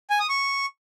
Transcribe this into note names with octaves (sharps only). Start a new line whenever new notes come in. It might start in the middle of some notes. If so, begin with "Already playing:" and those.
G#5
D#6
C#6